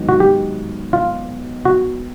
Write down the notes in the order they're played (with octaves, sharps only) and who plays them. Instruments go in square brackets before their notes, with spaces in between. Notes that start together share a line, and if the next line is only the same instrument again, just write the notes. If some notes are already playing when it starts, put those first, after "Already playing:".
Already playing: [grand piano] G#2 D#3 F#3 B3 D#4
[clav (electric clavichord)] F#4
G4
F4
F#4